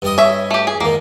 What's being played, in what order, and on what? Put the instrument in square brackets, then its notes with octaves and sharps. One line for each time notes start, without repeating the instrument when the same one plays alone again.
[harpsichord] G2 G3 D#5
[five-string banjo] C#5 E5
A3 G4
G#4
[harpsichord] G#2 D#3 [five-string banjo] A#3